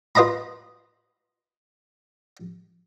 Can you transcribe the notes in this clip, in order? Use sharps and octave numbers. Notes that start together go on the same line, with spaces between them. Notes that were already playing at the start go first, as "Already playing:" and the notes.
F4 B4 D#5 A#5 B5